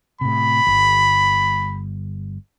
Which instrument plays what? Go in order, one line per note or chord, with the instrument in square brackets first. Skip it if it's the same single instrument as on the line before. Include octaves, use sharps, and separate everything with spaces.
[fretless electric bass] A2 C3 [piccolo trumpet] B5
[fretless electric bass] G1